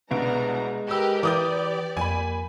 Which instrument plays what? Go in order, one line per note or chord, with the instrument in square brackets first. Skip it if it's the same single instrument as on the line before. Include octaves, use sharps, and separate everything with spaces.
[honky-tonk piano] C2 B2 D7 [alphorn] G#3 [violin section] B3 D4 A#5
[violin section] G4 A#4 B4 [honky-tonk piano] G#4 E6
[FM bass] E3 [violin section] G4 D5 [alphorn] B4 [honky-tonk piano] D6 D#6 G6
[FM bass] F2 [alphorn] A#3 [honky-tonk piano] G#5 B5